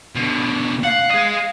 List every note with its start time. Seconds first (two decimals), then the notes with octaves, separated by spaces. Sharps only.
0.15 B2 D3
0.84 F5 F#5
1.10 G#4 D#5